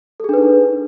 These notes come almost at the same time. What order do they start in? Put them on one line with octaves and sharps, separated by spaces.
A4 G#4 D4 B4 D#4